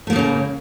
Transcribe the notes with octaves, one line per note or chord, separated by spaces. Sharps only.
A2 C#3 F3 A3 A#3